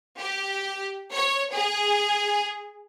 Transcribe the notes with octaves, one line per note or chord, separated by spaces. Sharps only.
G4
C#5
G#4